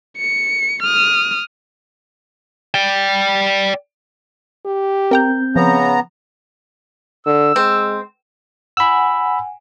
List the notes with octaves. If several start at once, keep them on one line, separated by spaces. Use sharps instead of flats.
C#7
D#6 F6
D5 G5
G4
C4 A#4 G5 A#5 G6
C#3 F3 B3 A#5
D3 E6
G#3 C4
F#5 G#5 B5 E6